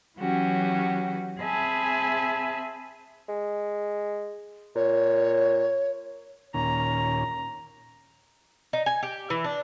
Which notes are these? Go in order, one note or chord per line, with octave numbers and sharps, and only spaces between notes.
E3 F#3 C#4 F#4 G4
C4 G#4 E5 G#5 A5 B5
G#3
A#2 C#5
D#2 A#2 C#4 A#5
D#4
G#5
G4
E3
D4